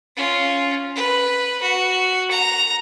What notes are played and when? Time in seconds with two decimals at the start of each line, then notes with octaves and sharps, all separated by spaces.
0.16 C#4 F4
0.95 B4
1.62 F#4
2.31 A#5